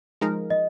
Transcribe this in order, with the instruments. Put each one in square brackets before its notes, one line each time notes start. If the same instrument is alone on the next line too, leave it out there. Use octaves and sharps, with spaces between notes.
[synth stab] F3 G#3 D#4 A#4
[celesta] D#5